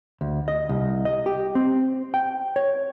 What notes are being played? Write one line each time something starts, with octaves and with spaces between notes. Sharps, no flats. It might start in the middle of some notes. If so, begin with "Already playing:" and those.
D2
D#5
C2
D#5
G4
C4
G5
C#5